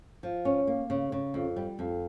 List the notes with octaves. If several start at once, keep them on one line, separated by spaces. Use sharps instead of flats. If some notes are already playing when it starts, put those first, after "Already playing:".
F3
C#4
A#3
C#3
C#3
F2
G3
F2